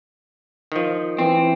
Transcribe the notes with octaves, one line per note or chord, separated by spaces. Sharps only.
D#3 F3
E3 C4